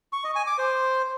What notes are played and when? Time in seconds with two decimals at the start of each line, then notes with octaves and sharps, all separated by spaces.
0.13 C#6
0.24 D#5
0.35 G#5
0.47 D6
0.58 C5